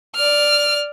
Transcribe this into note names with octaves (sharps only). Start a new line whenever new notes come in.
D5 F6